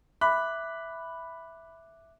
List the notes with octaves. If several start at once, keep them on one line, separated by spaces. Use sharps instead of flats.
E5 B5 D6 F#6